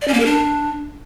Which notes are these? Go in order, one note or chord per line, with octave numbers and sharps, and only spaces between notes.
D5
C#4
A#3
A#4
D4